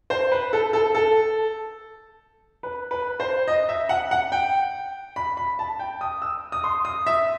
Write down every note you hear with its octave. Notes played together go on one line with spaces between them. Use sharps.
C5
B4
A4
A4
A4
B4
B4
C5
D#5
E5
F#5
F#5
G5
B5
B5
A5
G5
D#6
E6
D#6
C6
D#6
E5